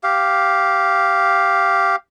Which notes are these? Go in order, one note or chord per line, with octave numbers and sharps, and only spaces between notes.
G4 F5